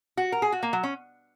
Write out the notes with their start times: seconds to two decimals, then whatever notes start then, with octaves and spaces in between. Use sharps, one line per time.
0.17 F#4
0.32 A#4
0.42 G#4
0.52 F#4
0.63 A#3
0.73 F#3
0.83 C#4